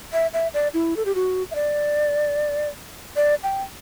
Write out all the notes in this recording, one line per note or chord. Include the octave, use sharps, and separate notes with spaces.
E5
E5
D5
E4
A4
G4
F#4
E5
D5
D5
G5